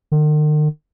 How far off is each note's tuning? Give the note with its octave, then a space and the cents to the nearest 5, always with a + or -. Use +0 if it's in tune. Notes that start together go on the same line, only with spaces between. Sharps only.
D#3 -45